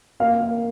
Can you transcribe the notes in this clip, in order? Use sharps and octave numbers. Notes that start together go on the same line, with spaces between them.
A#3 F5
A#3